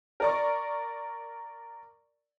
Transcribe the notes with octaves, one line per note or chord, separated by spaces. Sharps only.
A#4 D5 C#6